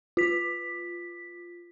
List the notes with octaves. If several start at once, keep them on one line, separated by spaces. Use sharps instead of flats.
F4 B6